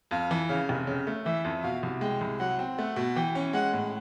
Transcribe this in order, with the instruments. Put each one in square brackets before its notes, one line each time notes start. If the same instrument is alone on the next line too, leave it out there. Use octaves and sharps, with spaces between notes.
[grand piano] F2 [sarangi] F5
[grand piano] E3
[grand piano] C#3 [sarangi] F5
[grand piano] F1
C#3
A3
[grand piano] E3 [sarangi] E5
[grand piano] F2
[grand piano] B2 [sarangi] F5
[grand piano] C2
[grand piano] G#3 [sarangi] G5
[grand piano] C2
[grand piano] F#3 [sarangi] F#5
[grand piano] C4
[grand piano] A3 [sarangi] F#5
[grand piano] B2
[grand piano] E3 [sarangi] G5
[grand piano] C#4
[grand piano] G#3 [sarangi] F#5
[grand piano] A2